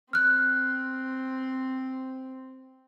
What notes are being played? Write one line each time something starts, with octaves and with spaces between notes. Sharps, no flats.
C4 F6 F#6